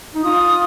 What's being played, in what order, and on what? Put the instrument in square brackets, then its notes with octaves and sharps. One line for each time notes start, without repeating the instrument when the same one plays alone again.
[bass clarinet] D#4
[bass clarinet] F4 [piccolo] D#6